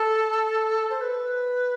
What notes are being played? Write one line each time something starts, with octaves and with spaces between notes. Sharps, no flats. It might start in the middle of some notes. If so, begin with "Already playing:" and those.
Already playing: A4
C5
B4